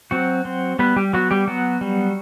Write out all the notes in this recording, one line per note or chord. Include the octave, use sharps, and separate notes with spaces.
F#3 C4 F#4
C4
G3 B3 B4
G3 G4
F#3 B3 F#4
G3 G4
F#3 B3 F#4
G3